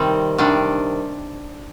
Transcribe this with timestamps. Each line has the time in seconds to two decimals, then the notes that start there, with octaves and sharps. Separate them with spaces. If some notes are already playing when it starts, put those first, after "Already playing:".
Already playing: C3 D#3 G3 C4
0.38 C3 D#3 G3 D4